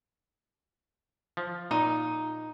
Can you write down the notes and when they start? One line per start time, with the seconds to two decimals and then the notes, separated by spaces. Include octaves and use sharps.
1.37 F3
1.71 A#2 D#4